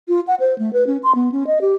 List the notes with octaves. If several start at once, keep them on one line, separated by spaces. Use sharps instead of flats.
F4
F#5
C5
A3
B4
C#4
C6
B3
C#4
D#5
G4